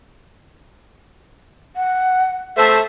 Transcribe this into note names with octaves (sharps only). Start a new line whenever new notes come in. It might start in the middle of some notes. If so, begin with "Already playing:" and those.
F#5
A3 C5 E5 A5